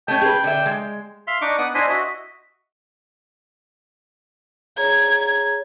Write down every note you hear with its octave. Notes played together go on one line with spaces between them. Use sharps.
A3 C#4 G5
G#4 B4
D3 E5
G#3
E5 F5 C6
D4 D#4 D#5 C#6 D6
B3 F#5 D#6
D4 E4 C5 D#5 E5 G#5
F#4 D#5 E5
G#4 C#5 A#5 G#6